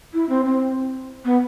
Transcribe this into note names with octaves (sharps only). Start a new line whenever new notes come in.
E4
C4
C4
B3